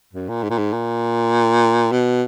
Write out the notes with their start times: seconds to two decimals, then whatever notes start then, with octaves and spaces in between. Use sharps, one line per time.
0.13 F#2
0.28 A#2
0.43 G#2
0.50 A#2
0.58 G#2
0.73 A#2
1.92 B2